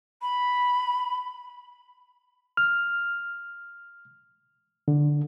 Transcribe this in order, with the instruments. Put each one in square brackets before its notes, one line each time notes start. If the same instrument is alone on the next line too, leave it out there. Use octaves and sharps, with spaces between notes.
[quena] B5
[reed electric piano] F6
D3